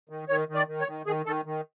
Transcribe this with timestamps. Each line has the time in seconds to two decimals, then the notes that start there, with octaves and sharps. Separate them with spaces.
0.09 D#3
0.29 D#3 C#5
0.48 D#3
0.55 D5
0.68 D#3
0.80 C#5
0.87 D#3
1.06 D#3 G#4
1.26 D#3 A4
1.45 D#3